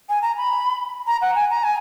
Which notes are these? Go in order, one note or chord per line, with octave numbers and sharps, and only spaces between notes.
G#5
A#5
B5
A#5
F#5
G#5
A#5
G#5